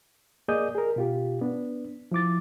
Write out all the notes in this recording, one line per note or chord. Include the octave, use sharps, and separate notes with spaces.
A#3 G#4 D5 D#5 D#6 G6
G#4 A#4
B2 F4 G4
B3 D4
F3 E4 D6 A6